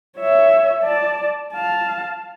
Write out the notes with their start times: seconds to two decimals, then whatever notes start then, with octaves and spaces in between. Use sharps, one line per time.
0.18 C#5 E5
0.82 D5 A5
1.53 F5 A5